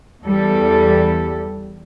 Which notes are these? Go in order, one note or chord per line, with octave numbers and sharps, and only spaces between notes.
E2 G3 A4